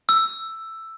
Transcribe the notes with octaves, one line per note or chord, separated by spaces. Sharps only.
E6